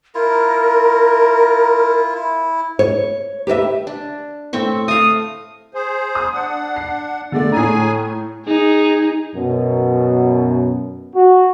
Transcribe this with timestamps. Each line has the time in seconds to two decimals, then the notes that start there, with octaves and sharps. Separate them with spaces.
0.15 E4 F4 A#4
2.14 E4
2.79 C#5
3.47 G4 B4 D5 E5
3.87 D4
4.53 A2 C4 E5 C#6
4.88 A3 F5 D#6
5.74 G#4 C5
6.15 D#6
6.33 D4 F#5
6.76 C7
7.32 D3 G#3 A3 D5
7.52 A2 G#4 G#5 A#5
8.46 D#4 G#4
9.35 F#2 B2
11.15 F#4